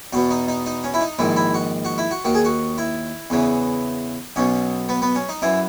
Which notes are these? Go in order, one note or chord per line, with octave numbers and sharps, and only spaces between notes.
E2 B2 F#4
D#4
D#4
D#4
C#4
E4
D#4
A#1 G#2 D#3 E4
E4
F#4
F#4
E4
F#4
D#2 D#3 F#4
G#4
F#4
E4
E2 C#3 E3
B1 B2 C#4
B3
B3
C#4
D#4
F#2 E3 E4